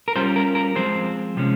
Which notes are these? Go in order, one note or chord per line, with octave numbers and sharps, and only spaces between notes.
A#4
G3 C#4 F4 C5
A#4
A#4
F3 G#3 C4 C5
C3 F3 G#3 C#4